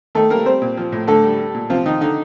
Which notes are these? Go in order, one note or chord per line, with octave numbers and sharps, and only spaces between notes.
D#3 A3 A4
G3 A#3 A#4
G3 C4 C5
A#2
F3
A2
D3 A3 A4
G3
G3
A#2
C3 F3 F4
D#3 D#4
D3 D#4